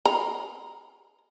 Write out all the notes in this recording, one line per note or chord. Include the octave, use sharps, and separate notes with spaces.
A#5